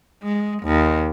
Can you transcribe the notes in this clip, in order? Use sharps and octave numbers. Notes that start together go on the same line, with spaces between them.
G#3
D#2